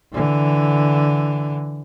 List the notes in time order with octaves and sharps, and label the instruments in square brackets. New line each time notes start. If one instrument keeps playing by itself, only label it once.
[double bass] D3 E3